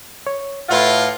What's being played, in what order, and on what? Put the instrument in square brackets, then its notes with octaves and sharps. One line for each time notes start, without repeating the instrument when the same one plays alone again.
[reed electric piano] C#5
[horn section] A2 F4 [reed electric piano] B4 E5 F#5